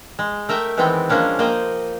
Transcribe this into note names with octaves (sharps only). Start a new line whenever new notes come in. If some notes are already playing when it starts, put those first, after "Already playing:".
G#3
A3 A#4 E5 G5
D#3 E3 G#3 B3 C4 G5
F3 G#3 A#3 C#4 D4
A#3 C5 D#5 G5